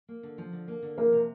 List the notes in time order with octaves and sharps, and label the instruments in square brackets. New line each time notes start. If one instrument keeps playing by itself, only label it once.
[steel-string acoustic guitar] A#3
D3
F3
D3
A#3
D3
[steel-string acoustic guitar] F3 [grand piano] A#3 A#4
[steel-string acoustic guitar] C3